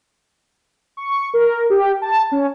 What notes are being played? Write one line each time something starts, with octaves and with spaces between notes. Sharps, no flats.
C#6
A#4
G4
A5
C#4